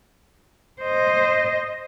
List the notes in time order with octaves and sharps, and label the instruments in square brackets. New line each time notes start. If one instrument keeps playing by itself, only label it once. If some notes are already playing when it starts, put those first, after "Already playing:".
[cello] C5 D#5